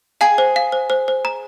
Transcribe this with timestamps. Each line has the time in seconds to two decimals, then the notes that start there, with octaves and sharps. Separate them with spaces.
0.21 G#4 F5
0.38 C5
0.56 F5
0.72 C5
0.90 C5
1.08 C5
1.25 A#5